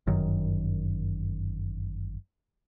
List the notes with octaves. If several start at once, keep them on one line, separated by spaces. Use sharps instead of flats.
G1 F#2 D#3